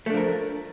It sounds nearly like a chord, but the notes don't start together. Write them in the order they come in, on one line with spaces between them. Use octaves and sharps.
A3 D4 F3 A#4